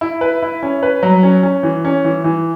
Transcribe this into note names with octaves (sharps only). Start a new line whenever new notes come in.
E4
B4
E4
C#4
B4
F#3
C#4
C#4
E3
C#4
E3
E3